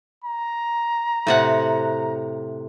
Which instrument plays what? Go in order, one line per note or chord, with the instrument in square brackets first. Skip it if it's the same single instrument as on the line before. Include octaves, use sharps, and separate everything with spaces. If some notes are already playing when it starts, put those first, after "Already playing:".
[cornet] A#5
[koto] A2 C3 F#5